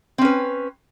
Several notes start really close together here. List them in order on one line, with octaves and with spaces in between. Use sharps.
C4 C#4 B4